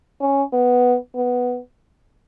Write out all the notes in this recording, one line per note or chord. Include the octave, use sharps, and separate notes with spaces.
C#4
B3
B3